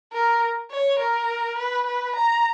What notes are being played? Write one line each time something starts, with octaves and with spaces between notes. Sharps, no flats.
A#4
C#5
A#4
B4
B4
A#5